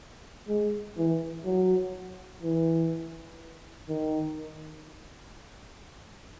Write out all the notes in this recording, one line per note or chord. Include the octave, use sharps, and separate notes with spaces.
G#3
E3
F#3
E3
D#3